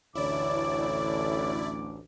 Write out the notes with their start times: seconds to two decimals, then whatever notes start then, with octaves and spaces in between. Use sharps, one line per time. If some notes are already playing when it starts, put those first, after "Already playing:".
0.15 A1 D2 E4 C#5 D5 D6